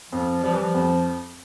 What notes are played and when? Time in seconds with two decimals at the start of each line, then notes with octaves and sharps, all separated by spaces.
0.12 F2 F3
0.43 F3 G3
0.53 E3
0.62 F3
0.75 F2